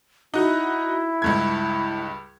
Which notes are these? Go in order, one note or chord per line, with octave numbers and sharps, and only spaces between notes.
D#4 E4 F#4
C#2 G2 G#6